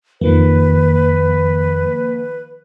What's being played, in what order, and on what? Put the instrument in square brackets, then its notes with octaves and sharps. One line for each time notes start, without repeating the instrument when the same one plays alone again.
[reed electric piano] F2 [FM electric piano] D#3 F3 A#3 [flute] B4